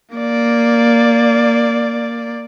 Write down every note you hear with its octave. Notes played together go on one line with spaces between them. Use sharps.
A#3 D5